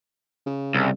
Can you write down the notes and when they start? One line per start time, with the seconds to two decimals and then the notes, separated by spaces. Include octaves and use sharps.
0.46 C#3
0.75 C2